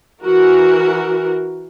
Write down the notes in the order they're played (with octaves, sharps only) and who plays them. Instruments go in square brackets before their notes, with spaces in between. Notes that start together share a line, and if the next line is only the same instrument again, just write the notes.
[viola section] E3 F#4 A#4